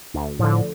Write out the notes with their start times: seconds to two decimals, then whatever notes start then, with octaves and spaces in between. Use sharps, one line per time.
0.14 D2
0.39 A2 D3 F3